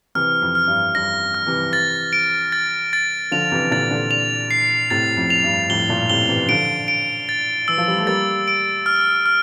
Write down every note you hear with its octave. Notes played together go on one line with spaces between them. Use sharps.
C3 E3 F6
F2
F6
G2
G2 A#6
F6
C3 E3
A6
D7
A6
A6
D3 F3 F7
C3 E3
A#2 D3 A6
A#2 D3
F7
C7
A2 C3 A6
F2 A2
F7
G2
F2 A2 G7
G2 A#2
A2 C3 G7
C3 E3
D3 F3 D7
D7
A6
E3 E6
F3
G3
A3
G3 A#3 A6
D7
F6
F6